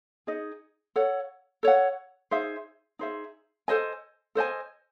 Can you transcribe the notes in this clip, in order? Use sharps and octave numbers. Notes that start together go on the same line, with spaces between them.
D#4 G#4 D#5
A4 C#5 F#5
A4 C#5 F#5
D#4 G#4 C5 E5
D#4 G#4 C5 E5
A4 C5 D#5 G#5
A4 C5 D#5 G#5